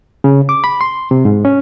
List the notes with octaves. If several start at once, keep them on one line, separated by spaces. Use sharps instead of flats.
C#3
D6
B5
C6
C3
G#2
C#4